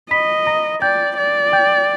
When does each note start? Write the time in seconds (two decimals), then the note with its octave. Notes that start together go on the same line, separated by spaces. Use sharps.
0.11 D#5 B5 B6
0.47 A#5 A#6
0.82 D5 G5 G6
1.18 D5
1.53 G5 G6